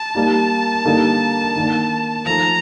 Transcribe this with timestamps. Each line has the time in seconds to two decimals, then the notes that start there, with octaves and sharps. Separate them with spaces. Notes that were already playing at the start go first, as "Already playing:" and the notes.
Already playing: A5
0.15 G3 A#3 D#4
0.85 D3 G3 A#3 D#4 A4
1.56 D#3 A#3 D4
2.26 F3 A3 D#4 A#5